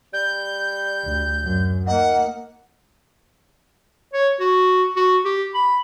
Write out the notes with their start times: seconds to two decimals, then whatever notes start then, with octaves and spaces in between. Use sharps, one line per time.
0.13 G3 G6
1.04 D2
1.43 F#2
1.87 A#3 D#4 F#5
4.13 C#5
4.40 F#4
4.96 F#4
5.25 G4
5.54 B5